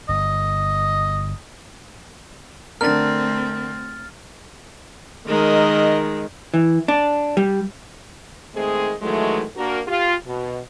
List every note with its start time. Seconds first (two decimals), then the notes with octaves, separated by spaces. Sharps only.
0.09 G1 D#5
2.81 D3 A3 C4 D4 A#4 F6 A6
5.28 D#3 G#3 A#4 D#5
6.54 E3
6.88 D4
7.37 G3
8.55 D#3 G#3 A3 C4 G#4 D#5
9.02 D#3 E3 F#3 G#3 A3
9.56 A#3 D4 F#4 A#4
9.88 F4 G4
10.26 B2